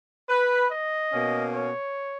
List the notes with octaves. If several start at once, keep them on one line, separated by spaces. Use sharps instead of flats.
B4
D#5
B2 A#3 C#4
C#5